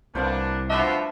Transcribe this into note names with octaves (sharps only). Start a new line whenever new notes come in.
C2 A#3 B3 D4 C5 F5
F3 D4 F4 F#4 B4 E5